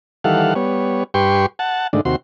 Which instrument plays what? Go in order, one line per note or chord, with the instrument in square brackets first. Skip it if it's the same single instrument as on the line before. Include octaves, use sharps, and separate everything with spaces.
[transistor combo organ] D#3 E3 G3 A4 F5 F#5
G3 B3 C#5
G2 G4 B4 G5 C6 C#6
F#5 A5
G#2 D3 D#3 A3 D4
D#2 C3 F#4 C6